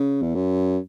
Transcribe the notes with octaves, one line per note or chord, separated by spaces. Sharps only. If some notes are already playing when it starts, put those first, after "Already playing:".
Already playing: C#3
E2
F#2